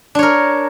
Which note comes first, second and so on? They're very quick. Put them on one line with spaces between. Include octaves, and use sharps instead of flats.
D4 C#5 A#4